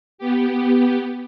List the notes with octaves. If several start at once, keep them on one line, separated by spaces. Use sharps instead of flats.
B3 G4